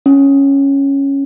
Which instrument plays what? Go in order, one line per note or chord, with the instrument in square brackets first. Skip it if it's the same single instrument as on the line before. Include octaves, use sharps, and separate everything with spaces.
[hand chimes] C#4